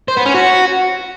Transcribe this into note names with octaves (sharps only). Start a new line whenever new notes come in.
C5
B3
C#4
F#4